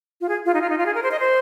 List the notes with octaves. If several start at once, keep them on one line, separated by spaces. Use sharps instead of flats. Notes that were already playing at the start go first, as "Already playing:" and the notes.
F4
G#4
F4
D#4
F4
D#4
F4
G#4
A#4
C5
D#5
C5